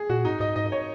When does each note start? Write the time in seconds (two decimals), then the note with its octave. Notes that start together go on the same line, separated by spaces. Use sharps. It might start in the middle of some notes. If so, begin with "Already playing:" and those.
Already playing: G#4
0.10 A#2 F#4
0.25 G#2 D#4
0.40 G#2 D#5
0.56 G#2 D#5
0.66 D#5
0.72 C#5